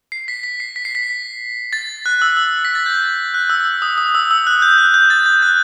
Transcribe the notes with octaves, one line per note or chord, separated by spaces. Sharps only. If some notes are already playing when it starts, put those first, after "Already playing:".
C7
B6
B6
C7
B6
C7
B6
A6
F#6
E6
E6
B6
A6
G6
F#6
E6
E6
D#6
D#6
E6
E6
F#6
G6
F#6
G6
A6
G6
F#6